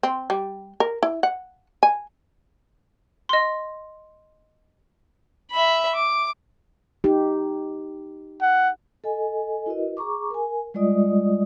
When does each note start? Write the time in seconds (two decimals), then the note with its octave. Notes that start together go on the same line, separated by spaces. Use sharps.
0.03 C4
0.30 G3
0.80 A#4
1.03 E4
1.23 F#5
1.83 G#5
3.29 D#5 C6
5.51 E5 B5
5.95 D6
7.04 D#4 G4
8.42 F#5
9.04 A4 D#5 G#5
9.66 E4 F#4 A#4 B4 D#5
9.97 G#4 A#5 C#6 D6
10.30 A#4 G#5
10.74 G3 G#3 F4 D5 D#5 D#6